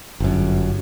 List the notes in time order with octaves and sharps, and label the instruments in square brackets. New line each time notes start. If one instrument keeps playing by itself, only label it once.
[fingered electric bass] G1 F#2